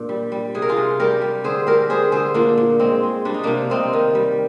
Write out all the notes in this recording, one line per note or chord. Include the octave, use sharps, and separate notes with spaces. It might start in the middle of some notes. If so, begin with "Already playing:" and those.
Already playing: A#2 D4
G3
G3
C3 G#4
A#4
F4 G#4
C3
G3 G4 A#4
G3
D3 G#4 C5
G3 G4 A#4
G3 G#4 C5
D3 G#4 C5
A#2 A#3 D4
A#2
G#3 C4
G#3
G3 D4
D#4
C3 A#3 D4
C3 C4 D#4
D#3
G3